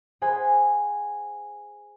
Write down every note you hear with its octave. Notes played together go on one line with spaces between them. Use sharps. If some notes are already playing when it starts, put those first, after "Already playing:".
G#4 C5 F#5 G#5 B5